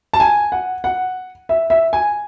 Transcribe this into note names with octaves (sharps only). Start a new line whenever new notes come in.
A5
G#5
F#5
F#5
E5
E5
G#5